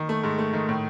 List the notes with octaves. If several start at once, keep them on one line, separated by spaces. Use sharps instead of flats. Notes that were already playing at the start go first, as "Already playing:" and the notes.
Already playing: D#3
A3
G#2
A3
D#3
A2